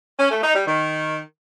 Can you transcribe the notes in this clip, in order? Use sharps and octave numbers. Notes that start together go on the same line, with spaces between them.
C#4
A3
D#4
G3
D#3